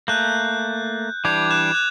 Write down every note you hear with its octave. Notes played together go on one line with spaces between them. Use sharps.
A3 A#3 F#6 G6
E3 G3 D4 D6 G6 G#6
F#6 G#6 E7
F#6